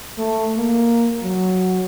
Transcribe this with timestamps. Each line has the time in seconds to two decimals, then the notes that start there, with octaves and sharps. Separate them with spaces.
0.18 A3
0.57 A#3
1.23 F#3